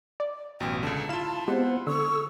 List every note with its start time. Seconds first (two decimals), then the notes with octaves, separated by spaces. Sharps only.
0.20 D5
0.60 A1 F#2 B2 G5
0.83 C#2 D3 A5
1.09 E4 F4 F5 E7
1.48 G#3 B3 C4 G4 C5 F#5
1.87 D3 A4 C#6 E6